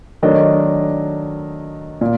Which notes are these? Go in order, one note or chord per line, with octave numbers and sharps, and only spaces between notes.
D#3 F#3 A3 D4 D#5
A#2